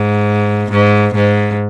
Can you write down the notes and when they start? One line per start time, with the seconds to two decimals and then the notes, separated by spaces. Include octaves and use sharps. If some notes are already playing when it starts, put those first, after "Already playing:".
Already playing: G#2
0.71 G#2
1.15 G#2